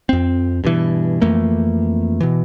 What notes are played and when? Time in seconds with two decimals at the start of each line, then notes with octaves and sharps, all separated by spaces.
0.09 F2 C4
0.64 G2 B2 E3
1.22 F2 E3 A3 A#3
2.20 B2 E3